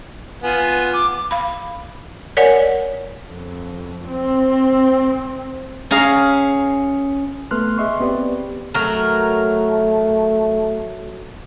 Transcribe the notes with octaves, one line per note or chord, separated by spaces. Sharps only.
B3 F4 G#5
D6
F5 B5
A#4 C#5 D5 F#5 G#5
F2
C4
C#4 G#4 F5 A#5
A3 B3 B4 C6 F6 F#6
G#4 D#5 E5 C6 C#6
B3 C4 G4 B4 D5
F#3 A3 A#4